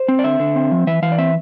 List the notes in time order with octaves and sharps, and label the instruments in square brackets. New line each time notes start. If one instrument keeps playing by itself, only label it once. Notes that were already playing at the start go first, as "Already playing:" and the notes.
Already playing: [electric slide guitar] C5
C4
D5
D3 E5
D3
C4
F3
E3 E5
E3 F5
D5
C4 E5